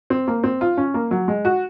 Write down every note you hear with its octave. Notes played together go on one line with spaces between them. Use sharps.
C4
A#3
C4
F4
C#4
A#3
F#3
G#3
F#4